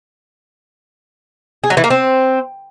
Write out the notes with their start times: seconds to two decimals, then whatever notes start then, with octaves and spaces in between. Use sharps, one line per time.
1.64 G#4
1.70 F#3
1.77 E3
1.84 A#3
1.90 C4